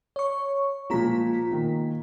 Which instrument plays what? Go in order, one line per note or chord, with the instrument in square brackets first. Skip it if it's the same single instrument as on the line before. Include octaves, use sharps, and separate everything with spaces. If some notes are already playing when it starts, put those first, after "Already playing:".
[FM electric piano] C#5 C#6
[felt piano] A#2 F3 G#3 [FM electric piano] F4 A#5 B6
[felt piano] A#2 D#3